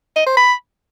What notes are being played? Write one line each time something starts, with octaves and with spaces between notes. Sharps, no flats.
D#5
C5
B5